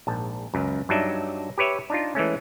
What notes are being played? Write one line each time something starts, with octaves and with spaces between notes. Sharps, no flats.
A#1 G#2 A5
C#2 F#2
G2 F#3 D4 D#4 E5
G4 B4 C#5 E5
D4 D#4 F4
E3 G#3 A3 C#4